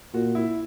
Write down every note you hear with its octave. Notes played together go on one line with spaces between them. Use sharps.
A#2 F#4
E4